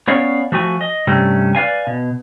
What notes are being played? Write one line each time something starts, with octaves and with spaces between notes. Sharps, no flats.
B3 C#4 C#5 D5 F5
F3 A3 F#4 G#5
D#5
G2 C3 G3 A3 C#4
B4 D5 F5 G#5
B2